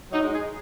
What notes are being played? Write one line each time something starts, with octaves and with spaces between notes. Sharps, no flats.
F#3 D#4
G#3
G#4